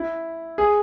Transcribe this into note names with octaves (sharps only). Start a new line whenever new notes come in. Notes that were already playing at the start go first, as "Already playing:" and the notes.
Already playing: E4
G#4